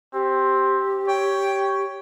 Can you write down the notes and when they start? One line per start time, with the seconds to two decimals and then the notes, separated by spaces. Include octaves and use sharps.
0.14 C4 G4
1.08 C#5 G5